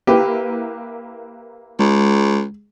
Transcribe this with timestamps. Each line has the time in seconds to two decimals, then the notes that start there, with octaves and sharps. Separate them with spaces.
0.07 A#3 E4 G4 B4
1.79 C#2 G#3